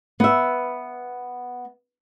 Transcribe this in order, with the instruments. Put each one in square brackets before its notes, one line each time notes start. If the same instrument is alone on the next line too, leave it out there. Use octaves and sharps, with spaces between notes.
[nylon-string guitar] B3 E5